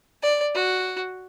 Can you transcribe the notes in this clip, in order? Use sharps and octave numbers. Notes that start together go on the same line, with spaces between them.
D5
F#4